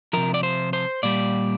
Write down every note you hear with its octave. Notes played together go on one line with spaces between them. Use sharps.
C3 F3 A#4
D5
C5
C5
A#2 G3 D5